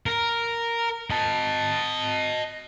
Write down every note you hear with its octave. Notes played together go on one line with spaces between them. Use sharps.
A#4
D#5 A5